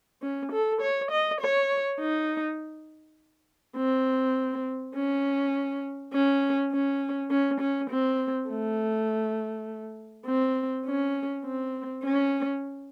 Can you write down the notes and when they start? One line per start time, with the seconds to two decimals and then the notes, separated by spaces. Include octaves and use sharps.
0.22 C#4
0.52 A4
0.81 C#5
1.11 D#5
1.40 C#5
2.00 D#4
3.76 C4
4.95 C#4
6.13 C#4
6.72 C#4
7.31 C#4
7.60 C#4
7.90 C4
8.49 A3
10.26 C4
10.86 C#4
11.45 C4
12.03 C#4